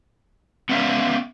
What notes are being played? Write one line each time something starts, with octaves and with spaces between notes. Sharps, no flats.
B3 C#4 D5 E5 F5